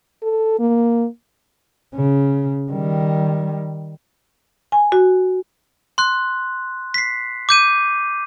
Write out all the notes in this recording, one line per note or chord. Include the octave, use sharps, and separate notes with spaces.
A4
A#3
C#3
D#3 G3
G#5
F#4
C6 F#6
B6 C7
D6 G6 D#7